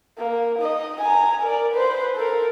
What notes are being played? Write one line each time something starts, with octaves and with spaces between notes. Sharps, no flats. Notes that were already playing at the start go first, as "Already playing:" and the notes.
A#3
D#4 D#5
G#5 A#5
A#4 D5
B4 C5
A4 A#4